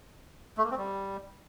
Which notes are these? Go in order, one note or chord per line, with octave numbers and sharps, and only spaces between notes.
A3
A#3
C4
G3